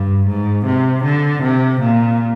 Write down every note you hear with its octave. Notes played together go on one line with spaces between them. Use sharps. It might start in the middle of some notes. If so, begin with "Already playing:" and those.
Already playing: G2
G#2
C3
D3
C3
A#2